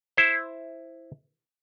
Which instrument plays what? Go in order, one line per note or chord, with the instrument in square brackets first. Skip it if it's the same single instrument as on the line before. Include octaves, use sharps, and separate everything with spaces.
[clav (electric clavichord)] E4 C5